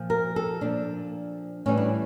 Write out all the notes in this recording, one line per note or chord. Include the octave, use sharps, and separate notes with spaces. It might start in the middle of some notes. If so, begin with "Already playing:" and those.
Already playing: A#2 F3
A#4
A4
A#2 F3 D4
A2 E3 G3 C#4
D4